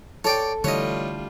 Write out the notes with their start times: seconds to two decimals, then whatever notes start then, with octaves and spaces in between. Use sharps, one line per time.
0.24 A4 C#5 D5 G5
0.64 D3 E3 G3 A3 F4 C#5 D#5